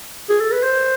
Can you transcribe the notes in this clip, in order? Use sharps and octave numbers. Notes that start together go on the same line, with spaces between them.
G#4
A4
B4
C5